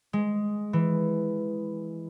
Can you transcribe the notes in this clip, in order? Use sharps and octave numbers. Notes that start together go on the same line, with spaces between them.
G#3
E3